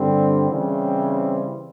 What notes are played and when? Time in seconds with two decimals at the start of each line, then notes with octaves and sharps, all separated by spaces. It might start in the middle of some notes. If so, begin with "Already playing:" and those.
Already playing: G2 D3 G3 C4
0.51 C#3 E3 G3 C4